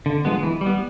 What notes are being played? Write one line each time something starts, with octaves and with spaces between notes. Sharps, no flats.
D3
F3 G#3 B3
E3
G3
B3